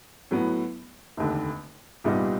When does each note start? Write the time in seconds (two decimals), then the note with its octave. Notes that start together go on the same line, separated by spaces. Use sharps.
0.31 A2 F#3 B3
1.17 F1 D#2 D3
2.04 C2 A#2 G3 B3 D#4